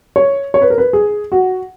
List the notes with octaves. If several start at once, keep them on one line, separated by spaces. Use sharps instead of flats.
C#5
C#5
B4
A#4
B4
G#4
F#4